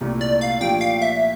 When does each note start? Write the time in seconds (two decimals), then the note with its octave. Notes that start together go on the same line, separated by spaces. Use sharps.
0.01 C2 A#2 A3 E4 G4
0.21 D5
0.41 F5
0.61 A#2 F3 A3 D4 G4 G5
0.81 F5
1.01 E5